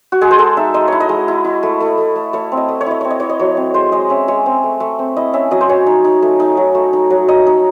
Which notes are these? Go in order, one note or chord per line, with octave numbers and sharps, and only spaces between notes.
F#4
G#3 G#4
C5
G#3 A4
D#4 E5
D#4 D#5
E4 C#5
D#5
G#3
E4
E4
A3
A3
A3
A3
A3 C#5
C4
D#5
A3
C#5
E4 D#5
C4 C#5
D#5
E4 C#5
D#5
F#3 C#5
C4
G#3 C5
G#3 D#5
C#4 E5
G#3 C#5
C4
A3
A3
C4
E4 D#5
C#4 E5
F#3 D#5
C5
C#4 C#5
D#4
D#4
A3
D#4
F#3
A3
D#4
F#3
D#4 D#5
D#4